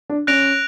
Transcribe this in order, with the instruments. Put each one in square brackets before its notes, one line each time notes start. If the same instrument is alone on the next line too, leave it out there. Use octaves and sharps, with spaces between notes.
[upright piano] D4
[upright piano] C#4 [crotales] F#6 A#6 D7 F7